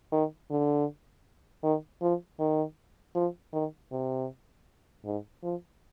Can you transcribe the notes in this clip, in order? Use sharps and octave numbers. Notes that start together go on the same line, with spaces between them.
D#3
D3
D#3
F3
D#3
F3
D#3
C3
G#2
F3